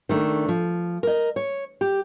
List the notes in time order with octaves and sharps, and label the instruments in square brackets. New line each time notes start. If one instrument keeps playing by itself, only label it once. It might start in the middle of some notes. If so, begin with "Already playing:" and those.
[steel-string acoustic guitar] D#3 A3 D4
F3
A#4 D#5
C#5
G4